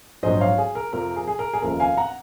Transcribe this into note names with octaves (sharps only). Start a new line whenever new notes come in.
A#1 G#2 F#3 C5 D#5
C#5 F5
G#4
A#4
F2 C3 F3 A#4
G#4
G#4
A#4
G#4
F1 D#2 C#3 F3 A#4
F5 G#5
F#5 A#5